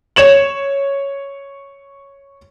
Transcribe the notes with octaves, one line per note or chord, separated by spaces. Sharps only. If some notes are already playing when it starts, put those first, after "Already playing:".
C#5 E7 F#7